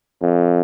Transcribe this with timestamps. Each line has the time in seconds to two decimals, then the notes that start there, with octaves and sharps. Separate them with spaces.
0.22 F2